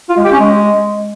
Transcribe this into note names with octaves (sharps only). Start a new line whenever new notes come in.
F4
G#3
G4
C#4
G#3